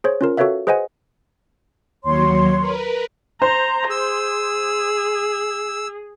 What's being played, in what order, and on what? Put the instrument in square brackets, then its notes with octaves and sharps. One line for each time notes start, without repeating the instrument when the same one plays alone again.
[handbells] G#4 C5 C#5
C#4 F4 A#4
F#4 A4 B4 C#5 E5 F5
G#4 B4 C5 D#5 F#5 G#5
[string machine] D#2 F#3 [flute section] C#5 C6
[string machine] A#4 B4
[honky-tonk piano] C5 [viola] A#5
[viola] G#4 [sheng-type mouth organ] E6